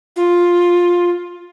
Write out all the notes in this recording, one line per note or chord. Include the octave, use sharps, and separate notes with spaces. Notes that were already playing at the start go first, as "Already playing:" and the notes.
F4